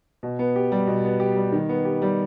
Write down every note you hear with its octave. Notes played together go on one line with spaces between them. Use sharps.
B2
B3
G4
G3
B2
B3
G4
G3
D#3
B3
G4
G3